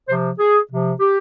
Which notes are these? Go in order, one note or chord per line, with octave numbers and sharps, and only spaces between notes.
C3 F3 C5
G#4
C3 F3
G4